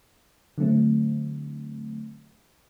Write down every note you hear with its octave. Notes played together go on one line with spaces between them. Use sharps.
D3 F#3 A3 C4